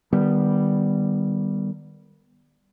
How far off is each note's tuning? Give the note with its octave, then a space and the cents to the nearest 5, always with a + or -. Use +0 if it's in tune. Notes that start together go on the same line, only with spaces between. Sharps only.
D#3 -35 G3 +0 B3 +0